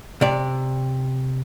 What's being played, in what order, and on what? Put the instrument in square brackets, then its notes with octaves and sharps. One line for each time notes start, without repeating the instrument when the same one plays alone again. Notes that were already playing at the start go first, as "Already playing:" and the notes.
[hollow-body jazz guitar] C3 D5